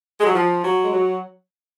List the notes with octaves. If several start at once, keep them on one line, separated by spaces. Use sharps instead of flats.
G#3
F#3
F3
F#3
G#3
F#3